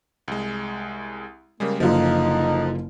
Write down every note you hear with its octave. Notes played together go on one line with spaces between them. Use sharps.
C2 G#3
C#3 G3 G#3 A#3
F#1 D3 F3 D#4 F4